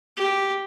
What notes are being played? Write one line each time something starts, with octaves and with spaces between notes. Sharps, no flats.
G4